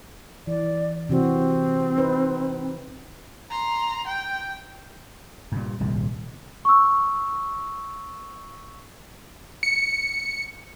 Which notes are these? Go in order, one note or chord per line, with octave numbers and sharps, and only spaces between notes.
E3 D5
C3 E3 C4 F#4
D#4 B4 C5
A#5 C6
G5
G2 A#2
D#1 C2 G#2 C3
C#6 E6
C#7